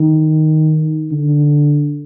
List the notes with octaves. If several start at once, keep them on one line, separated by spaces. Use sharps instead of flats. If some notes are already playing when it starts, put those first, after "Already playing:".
Already playing: D#3
D3